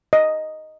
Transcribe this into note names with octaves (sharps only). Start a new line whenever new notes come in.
D#5